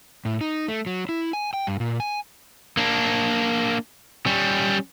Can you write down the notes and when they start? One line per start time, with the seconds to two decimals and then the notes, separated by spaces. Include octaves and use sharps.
0.25 A2
0.41 D#4
0.68 A3
0.86 F#3
1.09 E4
1.33 G#5
1.54 G5
1.67 G2
1.80 A#2
2.00 G#5
2.77 A#3 D4
4.26 G3 C#4